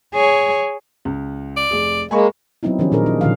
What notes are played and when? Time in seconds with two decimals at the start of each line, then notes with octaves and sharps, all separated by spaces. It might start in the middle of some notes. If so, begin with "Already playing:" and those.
0.14 G#4 C#5
1.05 C#2
1.57 D5
1.71 F1 G#4
2.11 G#3 A#3 G#5 B5 C#6
2.63 F#3 B3 C4 D#4 E4
2.79 D#3 F3 C#4 G4
2.92 A#2 D4 D#4 G#4 A#4
3.06 D#4
3.21 A#2 D3 D#3 F3 F4 F5